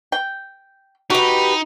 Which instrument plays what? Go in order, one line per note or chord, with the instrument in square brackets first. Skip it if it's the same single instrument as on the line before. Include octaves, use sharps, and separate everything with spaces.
[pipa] G5
[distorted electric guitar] D#4 [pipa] F#4 [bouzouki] G4 B4